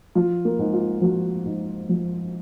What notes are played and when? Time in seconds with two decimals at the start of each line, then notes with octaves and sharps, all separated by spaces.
0.15 F3 F4
0.45 A#3
0.59 G#2
0.73 F4
1.02 F3 F#4
1.45 G#2
1.89 F3